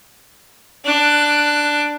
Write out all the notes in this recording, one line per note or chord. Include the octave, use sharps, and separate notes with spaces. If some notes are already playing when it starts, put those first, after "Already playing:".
D4 F#6